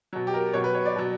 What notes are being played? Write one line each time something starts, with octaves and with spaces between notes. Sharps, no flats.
B2 F#3
G4
A#4
B2 F#3 C#5
B4
C#5
D5
B2 F#3